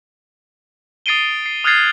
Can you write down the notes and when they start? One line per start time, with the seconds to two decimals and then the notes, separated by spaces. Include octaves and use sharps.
1.06 D#6 A6 C7 D7 D#7 G7
1.46 C7
1.64 D#6 F6 F#6 G#6 A6 C7